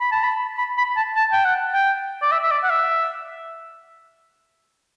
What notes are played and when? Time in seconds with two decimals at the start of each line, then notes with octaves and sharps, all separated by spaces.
0.01 B5
0.12 A5
0.23 B5
0.58 B5
0.78 B5
0.96 A5
1.16 A5
1.33 G5
1.45 F#5
1.73 G5
2.22 D5
2.32 E5
2.43 E5
2.51 D5
2.63 F#5
2.70 E5